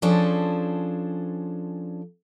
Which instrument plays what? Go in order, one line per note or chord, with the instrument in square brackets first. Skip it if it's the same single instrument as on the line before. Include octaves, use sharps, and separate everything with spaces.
[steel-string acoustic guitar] F3 C#4 D4 G#4 A4 C5